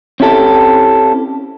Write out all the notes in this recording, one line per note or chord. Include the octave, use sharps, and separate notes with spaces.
C4 C#4 E4 G4 A4